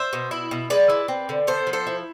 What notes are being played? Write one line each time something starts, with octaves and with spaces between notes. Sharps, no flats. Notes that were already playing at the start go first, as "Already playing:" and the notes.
Already playing: C5 E5
B2
E4
B2
G#3 B4 D5
E4
C4
D3
B3 A4 C5
F3
A4 C5
E4